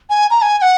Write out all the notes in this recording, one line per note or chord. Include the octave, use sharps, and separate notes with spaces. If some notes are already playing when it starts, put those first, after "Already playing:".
G#5
A#5
G#5
G#5
F#5